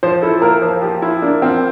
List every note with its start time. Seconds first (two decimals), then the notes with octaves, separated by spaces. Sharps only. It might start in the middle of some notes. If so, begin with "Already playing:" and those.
0.03 F3 C5
0.22 E4 A4
0.42 A#3 A#4
0.62 F3 C5
0.81 F3 G4
1.02 E4 F4
1.22 A#3 D4
1.42 F3 C4